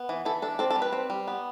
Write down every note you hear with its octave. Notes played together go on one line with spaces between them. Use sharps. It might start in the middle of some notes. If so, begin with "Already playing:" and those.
Already playing: B3
E3
E3 A4
D4 A4
C4 A4
A4
G3
B4
C4
G3
B3